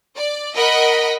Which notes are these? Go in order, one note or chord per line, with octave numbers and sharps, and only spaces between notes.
D5
A#4 D#5 F#5 B5